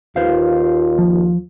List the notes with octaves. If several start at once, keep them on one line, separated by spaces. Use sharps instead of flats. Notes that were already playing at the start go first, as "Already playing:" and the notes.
D#2 F4 B4 C5 F5
F3